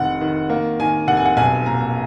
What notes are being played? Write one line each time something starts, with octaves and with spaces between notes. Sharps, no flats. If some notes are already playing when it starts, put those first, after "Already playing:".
Already playing: F1 D#3 F#5
D#3
A#3
D#3 G#5
F1 F#5
G#5
F#5
B1 G#5
A#2 A#5